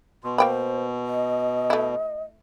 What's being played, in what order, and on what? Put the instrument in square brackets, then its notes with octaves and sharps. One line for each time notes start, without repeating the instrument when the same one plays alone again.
[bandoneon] B2 [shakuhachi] C6
[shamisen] A#3 G5 B5 [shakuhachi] C5
[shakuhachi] D#5
[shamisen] A3 E4